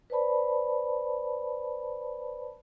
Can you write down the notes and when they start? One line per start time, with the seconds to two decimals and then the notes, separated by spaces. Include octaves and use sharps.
0.10 B4 C5 D5 A5 B5